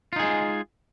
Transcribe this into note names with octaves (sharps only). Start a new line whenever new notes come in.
G#3 D#4 F4 G#4